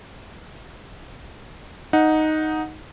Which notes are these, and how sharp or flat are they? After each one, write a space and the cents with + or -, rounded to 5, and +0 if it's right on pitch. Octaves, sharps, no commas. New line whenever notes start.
D#4 +0 F#5 -10